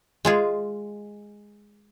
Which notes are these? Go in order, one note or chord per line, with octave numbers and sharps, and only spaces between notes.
G#3 F4 G#4